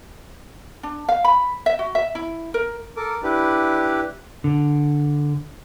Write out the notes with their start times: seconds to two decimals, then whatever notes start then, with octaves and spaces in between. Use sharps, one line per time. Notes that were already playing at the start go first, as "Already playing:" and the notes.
0.83 D4
1.09 F5
1.24 B5
1.66 E5
1.79 F#4
1.95 E5
2.15 E4
2.54 A#4
2.97 A4 A#4 D6
3.23 D4 E4 G4 B4
4.44 D3